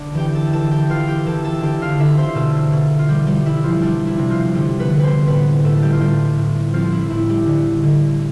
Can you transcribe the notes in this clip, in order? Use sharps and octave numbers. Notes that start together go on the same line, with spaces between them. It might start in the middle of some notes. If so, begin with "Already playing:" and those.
Already playing: D3 D4 D5
E3 G4 G5
G5
A4 A5
E3 A4 A5
G4 G5
E3 F4 F5
G4 G5
E3 A4 A5
A4 A5
A5
D3 G4 G5
F4 F5
D3 E4 E5
C4 C5
B2 A3 A4
B2
F4
E3 G3 G4
G3 G4
E3 E4
F3 F4
G3 D4 G4
E4
C3
F3 F4
D3 G3 G4
B3 B4
D3
C4 B4 C5
A2 B3 B4
A2 A3 A4
G3 G4
F4
A2 G3 G4
A2
F3 C4 F4
E4
A2 E4
G3 G4
D3
D3